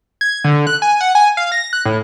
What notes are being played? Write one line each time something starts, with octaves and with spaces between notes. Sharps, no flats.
G#6
D3
F#6
G#5
F#5
G#5
F5
A#6
F#6
A2